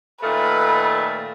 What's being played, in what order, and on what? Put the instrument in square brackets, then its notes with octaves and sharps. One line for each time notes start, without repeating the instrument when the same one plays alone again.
[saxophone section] A#2 D#3 A3 [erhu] B4